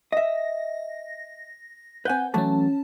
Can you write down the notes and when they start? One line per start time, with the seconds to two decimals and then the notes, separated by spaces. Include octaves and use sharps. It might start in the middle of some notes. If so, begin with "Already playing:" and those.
0.12 D#5 E5 A#6
2.05 C4 B4 F#5 G#5 G6
2.34 E3 F#3 A3 C#4 A5